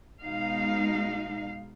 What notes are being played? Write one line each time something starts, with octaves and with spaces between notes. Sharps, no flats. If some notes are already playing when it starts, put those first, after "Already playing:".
B2 G#3 D#4 F5